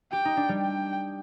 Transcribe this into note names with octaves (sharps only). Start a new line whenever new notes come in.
G4 G5
D#4
D4
G3
G5